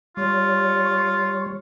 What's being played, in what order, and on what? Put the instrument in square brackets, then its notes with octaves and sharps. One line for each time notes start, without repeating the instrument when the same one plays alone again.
[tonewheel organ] G3 C#5 [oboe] F4